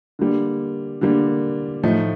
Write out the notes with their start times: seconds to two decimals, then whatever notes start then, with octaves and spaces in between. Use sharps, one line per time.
0.19 D3 G3 A#3
1.01 D3 G3 A#3
1.83 A2 F3 A3 D#4